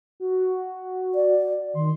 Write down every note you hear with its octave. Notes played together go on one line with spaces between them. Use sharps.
F#4
D5
D#3 C6